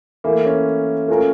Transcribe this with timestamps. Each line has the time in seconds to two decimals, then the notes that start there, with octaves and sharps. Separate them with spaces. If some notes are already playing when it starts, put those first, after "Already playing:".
0.24 E3 A3 A#3 E4 A#4
0.46 C#4
1.08 A3 C#4 F4 A#4